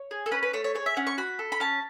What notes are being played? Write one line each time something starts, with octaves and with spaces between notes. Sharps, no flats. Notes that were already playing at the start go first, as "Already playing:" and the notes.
Already playing: C#5
G#4
A4
C#4 B4
B4
A3 C#5
C#5
G#4 C#5
E5
C#4 F#5
C#6
F#4 B5
A4
B5
C#4 A5